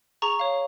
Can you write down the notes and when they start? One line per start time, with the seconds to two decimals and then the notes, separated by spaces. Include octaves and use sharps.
0.22 G#4 A#5 C#6
0.39 C#5 F5